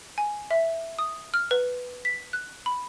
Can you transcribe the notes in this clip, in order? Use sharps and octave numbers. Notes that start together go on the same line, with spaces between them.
G#5
E5
D#6
F6
B4
B6
F#6
B5